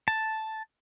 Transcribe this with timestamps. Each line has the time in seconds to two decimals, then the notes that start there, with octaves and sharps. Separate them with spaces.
0.08 A5